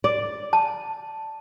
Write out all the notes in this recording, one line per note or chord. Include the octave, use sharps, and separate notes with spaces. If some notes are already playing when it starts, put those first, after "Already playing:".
D5
A5